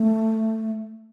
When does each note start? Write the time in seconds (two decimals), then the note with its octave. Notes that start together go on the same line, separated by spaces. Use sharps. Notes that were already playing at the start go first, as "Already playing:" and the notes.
Already playing: A3